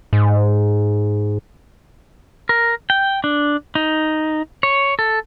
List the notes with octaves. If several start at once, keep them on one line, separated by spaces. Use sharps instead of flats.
G#2
A#4
G5
D4
D#4
C#5
A4